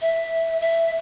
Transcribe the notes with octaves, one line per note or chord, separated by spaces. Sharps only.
E5
E5